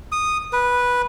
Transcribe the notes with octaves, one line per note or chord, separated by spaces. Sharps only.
D#6
B4